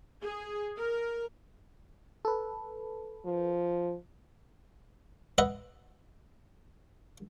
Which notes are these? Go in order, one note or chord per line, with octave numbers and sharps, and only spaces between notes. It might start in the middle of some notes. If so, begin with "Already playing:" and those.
G#4
A#4
A4 B4
F3
B4 D#5 E5 F#5